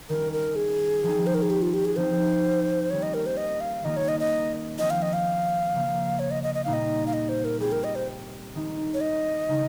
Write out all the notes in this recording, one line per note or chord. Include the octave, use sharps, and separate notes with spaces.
D#3 G3 C#4 A#4
A#4
G#4
F3 C4 D#4
C5
A#4
G#4
G4
F4
G4
G#4
F3 C4 D#4 C5
D#3 G3 A#3 C#4 F4 C#5
D#5
A#4
C5
D#5
F5
D#3 A#3 C#4 F4 D#5
C#5
D#5
D#5
F3 C4 F4 D#5
F5
D#5
F5
C#3 F3 A#3
C#5
D#5
D#5
D#5
A#2 G3 A#3 D#4 F5
D#5
F5
D#5
C5
A#4
G3 C4 F4 G#4
A#4
D#5
C5
D#3 G#3 D#4
C#5
D#5
C#3 G#3 D#4